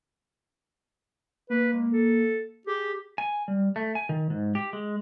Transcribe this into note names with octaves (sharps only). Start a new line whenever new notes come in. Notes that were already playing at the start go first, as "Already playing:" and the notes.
A#3 B4
G#3
A4
G4 G#4
G#5
G3
A3
G#5
D#3
G#2
G4
G#3